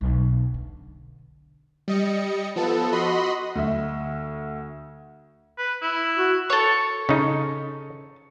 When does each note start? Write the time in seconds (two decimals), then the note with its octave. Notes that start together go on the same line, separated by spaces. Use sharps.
0.01 B1
0.54 D3
1.88 G3 D#5 C#7
2.56 F3 B3 A4
2.92 F#4 D#5 B5 C6
3.55 D2 E5
5.58 B4
5.82 E4
6.17 F#4
6.50 A4 C#5
7.09 C#3 D#4